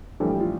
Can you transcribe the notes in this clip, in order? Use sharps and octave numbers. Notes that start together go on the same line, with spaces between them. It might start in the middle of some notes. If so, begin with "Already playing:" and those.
A#1 A2 E3 G3 A4
G4
F4